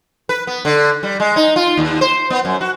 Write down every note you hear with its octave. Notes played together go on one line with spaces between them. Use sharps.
B4
B3
D3
G3
G#3
D#4
F4
D#2
C5
B3
F#2
F#4